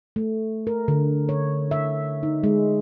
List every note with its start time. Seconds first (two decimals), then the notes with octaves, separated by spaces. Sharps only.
0.16 A3
0.67 A#4
0.88 D3
1.29 C#5
1.71 E5
2.23 D#4
2.44 G#3